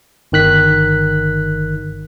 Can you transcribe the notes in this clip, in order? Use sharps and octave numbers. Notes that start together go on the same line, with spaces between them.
G1 D#3 F#6 B6